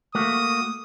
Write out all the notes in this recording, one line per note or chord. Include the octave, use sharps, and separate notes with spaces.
A3 A#3 F#4 D#6